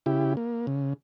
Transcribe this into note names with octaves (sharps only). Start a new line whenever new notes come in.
C#3 E4 G4
A#3
C#3